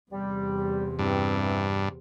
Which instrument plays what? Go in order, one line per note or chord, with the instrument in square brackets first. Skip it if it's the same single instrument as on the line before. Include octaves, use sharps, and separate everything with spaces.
[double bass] E2 C3 [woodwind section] G3
[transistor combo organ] G2 [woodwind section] E3 C4